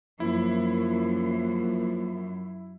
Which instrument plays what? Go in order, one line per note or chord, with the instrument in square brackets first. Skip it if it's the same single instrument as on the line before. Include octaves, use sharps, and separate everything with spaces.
[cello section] F#2 [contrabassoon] F3 [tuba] A#3 [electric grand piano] E4